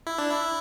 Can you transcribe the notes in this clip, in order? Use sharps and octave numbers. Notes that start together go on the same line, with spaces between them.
E4
D4
E4